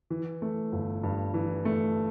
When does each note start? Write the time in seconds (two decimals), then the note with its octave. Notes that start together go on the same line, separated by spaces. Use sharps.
0.10 E3
0.42 A3
0.72 G1
1.03 G2
1.34 E3
1.65 A3